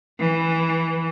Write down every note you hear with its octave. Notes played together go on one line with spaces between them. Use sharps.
E3